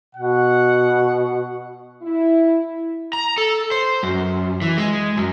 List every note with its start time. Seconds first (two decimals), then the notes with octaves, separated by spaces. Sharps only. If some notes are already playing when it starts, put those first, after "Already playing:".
0.15 B2 F#5
2.01 E4
3.13 A#5
3.38 A4
3.71 C5
4.03 F#2
4.62 E3
4.78 G#3
5.17 F#2